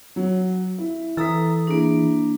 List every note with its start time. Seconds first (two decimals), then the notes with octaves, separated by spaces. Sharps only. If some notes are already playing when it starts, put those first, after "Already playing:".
0.16 F#3
0.78 E4
1.17 E3 A4 A#5 D#6 E6 B6
1.67 A#3 D4 E4 G#4